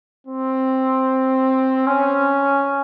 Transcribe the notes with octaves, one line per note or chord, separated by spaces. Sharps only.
C4
C#4